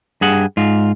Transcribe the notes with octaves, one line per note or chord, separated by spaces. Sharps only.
G2 G#4 F#5
G#2 F4